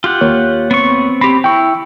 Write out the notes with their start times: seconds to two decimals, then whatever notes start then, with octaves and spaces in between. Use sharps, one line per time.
0.04 F4 G4 F#5
0.21 D#2 A#3 C#5
0.71 B3 C4 C#6
1.21 C4 G4 B5
1.44 E4 G5 C#6